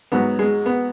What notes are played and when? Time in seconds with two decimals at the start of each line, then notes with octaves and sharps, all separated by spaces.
0.12 G#2 F#3 B3
0.39 G#3
0.66 B3